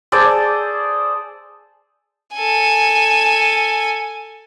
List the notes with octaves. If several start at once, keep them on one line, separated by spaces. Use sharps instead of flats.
G#4 A4 C5 D5
A4 G#5